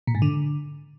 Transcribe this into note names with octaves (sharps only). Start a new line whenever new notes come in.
A#2
G#2
D3